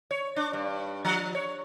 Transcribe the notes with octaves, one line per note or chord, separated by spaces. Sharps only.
C#5
D4
G2
F3
C#5